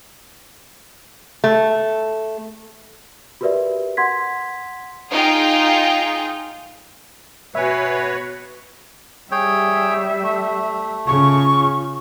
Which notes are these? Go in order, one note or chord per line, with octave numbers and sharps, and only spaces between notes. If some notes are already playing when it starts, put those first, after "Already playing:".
A3
F#4 G4 A#4 B4 D5 E5
F#5 C6 G#6 B6
D#4 F4 G#4 F5 G5
B2 F#4 B4 C#5 E5 G#5
G3 G#4 C#5 E5 G5
A3
C#3 F4 C#6